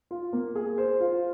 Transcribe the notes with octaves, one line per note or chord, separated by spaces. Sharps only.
F4
A#3
G#4
C5
F4